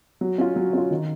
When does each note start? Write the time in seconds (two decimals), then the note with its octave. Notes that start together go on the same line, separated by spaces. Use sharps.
0.21 F#3
0.38 C#4 F4
0.56 F#3
0.73 C#4 F4
0.91 D#3